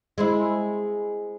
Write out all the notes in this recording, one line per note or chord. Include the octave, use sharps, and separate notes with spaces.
G#3 C4 E4